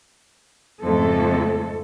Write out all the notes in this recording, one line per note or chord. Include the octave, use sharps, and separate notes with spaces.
F2 G#2 C#3 A3 A4